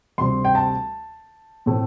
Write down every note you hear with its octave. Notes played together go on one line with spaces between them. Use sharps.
D2 C3 G3 C4 C6
G5
A5
A2 A3 C4